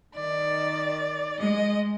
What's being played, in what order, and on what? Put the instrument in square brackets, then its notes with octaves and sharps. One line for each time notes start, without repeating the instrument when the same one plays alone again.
[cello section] D#3 [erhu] D5
[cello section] G#3 [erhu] D#5